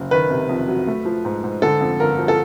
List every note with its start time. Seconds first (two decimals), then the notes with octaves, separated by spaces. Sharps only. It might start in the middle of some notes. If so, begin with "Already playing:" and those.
Already playing: F#1
0.11 D#3 B4
0.30 C3
0.49 F2
0.68 F#3
0.87 A3
1.05 F3
1.25 G#2
1.44 G#2
1.62 D3 A4
1.81 F2
2.00 G1 A#4
2.19 F3
2.28 A4